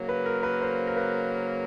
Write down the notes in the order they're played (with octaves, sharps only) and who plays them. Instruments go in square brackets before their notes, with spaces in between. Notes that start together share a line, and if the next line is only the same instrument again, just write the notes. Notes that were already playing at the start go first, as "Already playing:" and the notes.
Already playing: [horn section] C#3 F#3 A#3
[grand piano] B4
A#4
B4
C5
A#4
B4